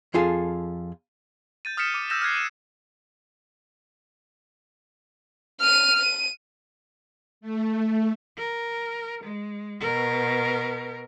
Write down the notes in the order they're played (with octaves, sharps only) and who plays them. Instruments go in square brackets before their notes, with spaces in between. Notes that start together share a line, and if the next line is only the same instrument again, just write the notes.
[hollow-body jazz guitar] F2 F4 G#4 A4 F5
[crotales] G6 A6 D#7
D#6 F6 A6 B6 C#7 E7
D6 D#7
E6 F6 G6 A#6 E7
F6 F#6 G#6 C7
D#7 E7
[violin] F6 D#7
D#7
[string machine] A3
[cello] A#4
G#3
B2 A#4